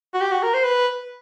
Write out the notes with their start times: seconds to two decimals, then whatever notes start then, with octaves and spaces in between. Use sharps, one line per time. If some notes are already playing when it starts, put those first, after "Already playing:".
0.14 F#4
0.21 G4
0.31 F#4
0.43 A#4
0.54 C5
0.64 B4